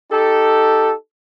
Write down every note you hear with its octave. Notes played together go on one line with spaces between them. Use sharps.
D#4 G4 A4